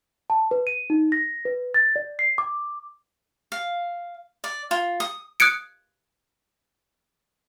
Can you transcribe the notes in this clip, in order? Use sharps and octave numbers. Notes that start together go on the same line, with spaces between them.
A5
B4
D#7
D#4
A#6
B4
A6
D5
C7
D6
F5
D5
F4
D#6
D#6 F#6 G#6 C#7 D7